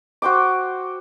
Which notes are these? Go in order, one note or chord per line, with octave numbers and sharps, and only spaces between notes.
F#4 C5 G5 D6